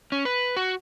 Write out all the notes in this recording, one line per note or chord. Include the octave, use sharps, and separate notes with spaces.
C#4
B4
F#4